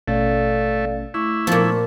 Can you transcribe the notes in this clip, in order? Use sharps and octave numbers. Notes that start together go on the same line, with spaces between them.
A1 B2 A3 C#4 A4 D5 F5
A3 E4 C#6 D6
A#2 F3 B3 A4 F5